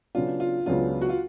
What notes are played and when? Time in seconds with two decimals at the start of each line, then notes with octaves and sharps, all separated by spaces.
0.15 C#3 F#3 B3 D4 F4
0.40 F4
0.66 C#2 C#3 F#3 B3 D4 F4
1.01 F#4
1.09 F4